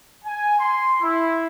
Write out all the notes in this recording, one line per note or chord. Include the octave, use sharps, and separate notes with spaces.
G#5
C6
E4